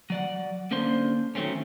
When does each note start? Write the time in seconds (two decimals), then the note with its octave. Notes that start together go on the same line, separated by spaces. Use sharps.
0.10 F#3 D5 F#5
0.71 D3 A#3 C#4 D4 C5 C6
1.35 D#3 F#3 A3 C4 C#4